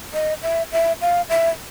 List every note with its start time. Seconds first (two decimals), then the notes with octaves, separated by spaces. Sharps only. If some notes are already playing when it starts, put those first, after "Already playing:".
0.14 D#5
0.43 E5
0.72 E5
1.01 F5
1.29 E5